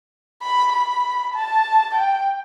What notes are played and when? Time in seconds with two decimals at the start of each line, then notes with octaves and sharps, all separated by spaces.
0.42 B5
0.73 B5
1.34 A5
1.95 G5